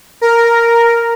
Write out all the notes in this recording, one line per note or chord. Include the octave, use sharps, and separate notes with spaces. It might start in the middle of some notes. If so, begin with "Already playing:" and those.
A#4